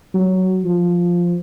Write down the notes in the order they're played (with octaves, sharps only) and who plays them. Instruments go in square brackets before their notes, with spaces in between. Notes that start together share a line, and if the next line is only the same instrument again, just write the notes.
[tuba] F#3
F3